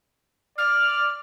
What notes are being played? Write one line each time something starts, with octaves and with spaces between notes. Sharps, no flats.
D5 F6